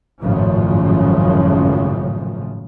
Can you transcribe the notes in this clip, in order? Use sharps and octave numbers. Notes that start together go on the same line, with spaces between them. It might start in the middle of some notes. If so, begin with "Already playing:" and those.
G#1 F#2 A2 C#3 F3